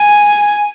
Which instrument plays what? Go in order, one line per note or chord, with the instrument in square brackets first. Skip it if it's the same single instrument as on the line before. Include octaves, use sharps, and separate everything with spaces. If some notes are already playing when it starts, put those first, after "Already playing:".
Already playing: [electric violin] G#5